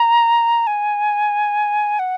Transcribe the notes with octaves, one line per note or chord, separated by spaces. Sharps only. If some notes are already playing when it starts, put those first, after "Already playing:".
Already playing: A#5
G#5
F#5